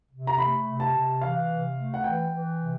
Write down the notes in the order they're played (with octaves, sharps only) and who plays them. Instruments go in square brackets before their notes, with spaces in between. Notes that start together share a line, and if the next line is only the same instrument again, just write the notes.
[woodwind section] C3
[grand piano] A#5
[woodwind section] A3 [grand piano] B5
[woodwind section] C3
[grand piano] A5
[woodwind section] C3
[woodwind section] E3 [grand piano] F5
[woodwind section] C3
A3
[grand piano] F#5
[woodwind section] E3 [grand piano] G5
[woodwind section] E3
C3